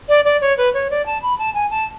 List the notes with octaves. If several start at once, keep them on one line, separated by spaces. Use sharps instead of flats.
D5
D5
C#5
B4
C#5
D5
A5
B5
A5
G#5
A5